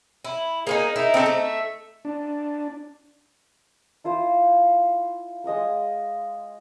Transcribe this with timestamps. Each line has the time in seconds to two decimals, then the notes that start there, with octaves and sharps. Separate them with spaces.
0.24 E4
0.67 A#3 C#4 D#4 G#4
0.96 D#4 E4
1.14 C4 D4 A4
1.26 A3
1.40 E5
2.05 D4
4.04 E4 F4 C5
5.44 G#3 D#5 F5 C#6